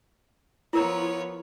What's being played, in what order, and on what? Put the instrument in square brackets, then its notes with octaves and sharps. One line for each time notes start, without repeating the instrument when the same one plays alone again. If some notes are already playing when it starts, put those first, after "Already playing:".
[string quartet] F3 B3 C#5 [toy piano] E4 A#4 A#5